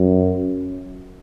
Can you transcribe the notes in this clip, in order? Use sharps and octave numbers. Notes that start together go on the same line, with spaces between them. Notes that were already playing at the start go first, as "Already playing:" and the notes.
Already playing: F#2